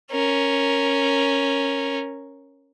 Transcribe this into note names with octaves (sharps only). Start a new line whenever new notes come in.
C#4 A#4